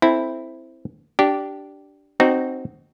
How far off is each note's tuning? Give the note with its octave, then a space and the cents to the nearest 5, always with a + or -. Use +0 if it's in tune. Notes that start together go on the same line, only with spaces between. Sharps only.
C4 +0 E4 +0 A4 +0
D4 -5 G4 -15
C4 +0 D#4 -20 F#4 +10